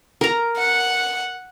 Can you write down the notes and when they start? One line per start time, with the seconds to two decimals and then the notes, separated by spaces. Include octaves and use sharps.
0.21 A#4 A#5
0.58 F#5